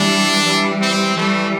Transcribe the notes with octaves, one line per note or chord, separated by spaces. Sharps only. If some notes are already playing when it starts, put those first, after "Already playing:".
Already playing: E3 G3 D4
E3 G3
C4
E3 G3 A3